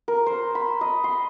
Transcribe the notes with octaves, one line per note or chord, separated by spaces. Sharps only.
A#4
C5
B5
D#5
C6